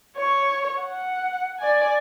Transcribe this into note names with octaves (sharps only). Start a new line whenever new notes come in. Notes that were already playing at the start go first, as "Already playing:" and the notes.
C#5
F#5
D5 G#5